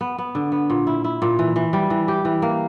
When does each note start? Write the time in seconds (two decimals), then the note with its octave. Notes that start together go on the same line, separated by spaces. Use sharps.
0.01 B3
0.18 B3
0.35 D3
0.52 B3
0.70 A#2
0.87 E4
1.04 E4
1.22 A#2
1.39 E3
1.56 E3
1.73 G3
1.90 E3
2.08 G4
2.25 E3
2.42 A#3